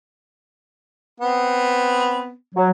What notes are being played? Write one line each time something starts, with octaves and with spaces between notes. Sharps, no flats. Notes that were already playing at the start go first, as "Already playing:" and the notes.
B3 C4
F#3